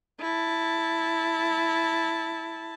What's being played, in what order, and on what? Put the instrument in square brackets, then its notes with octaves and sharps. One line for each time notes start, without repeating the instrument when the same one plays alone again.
[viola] E4 A5